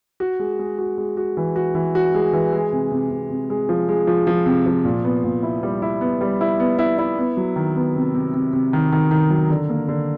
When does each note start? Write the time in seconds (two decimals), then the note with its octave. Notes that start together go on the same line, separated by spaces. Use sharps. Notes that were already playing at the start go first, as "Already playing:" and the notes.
0.20 F#4
0.39 G#3
0.59 G#3
0.79 F#4
0.98 G#3
1.17 F#4
1.37 E3
1.56 F#4
1.75 E3
1.95 F#4
2.14 G#3
2.33 E3
2.53 G#3
2.72 C3
2.91 C3
3.10 C3
3.30 C3
3.50 G#3
3.69 F3
3.89 G#3
4.07 F3
4.27 F3
4.46 C3
4.66 F3
4.85 A#2
5.04 B3
5.24 A#2
5.43 E4
5.63 G3
5.82 E4
6.01 B3
6.21 G3
6.41 E4
6.60 B3
6.79 E4
6.98 E4
7.18 B3
7.37 F#3
7.56 D#3
7.75 B3
7.96 C3
8.15 C3
8.34 C3
8.53 C3
8.73 D#3
8.92 D#3
9.11 D#3
9.30 F#3
9.50 D3
9.70 A#3
9.88 D3